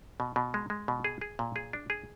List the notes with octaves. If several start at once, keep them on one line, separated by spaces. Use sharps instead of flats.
B2
B2
G#3
G#3
B2
G#4
G#4
A#2
G#4
D4
G#4